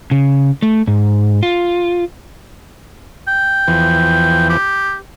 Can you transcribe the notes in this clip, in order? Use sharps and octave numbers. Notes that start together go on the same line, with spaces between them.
C#3
A3
G#2
F4
G5
E2 E3 F3
G4